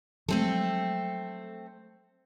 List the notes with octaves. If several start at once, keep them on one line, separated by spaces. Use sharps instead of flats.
F3 F#3 G#3 A3 C4 A4